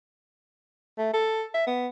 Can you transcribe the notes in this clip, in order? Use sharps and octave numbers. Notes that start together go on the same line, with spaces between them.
A3
A4
E5
B3